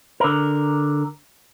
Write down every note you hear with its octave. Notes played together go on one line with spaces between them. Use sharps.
D3 A#4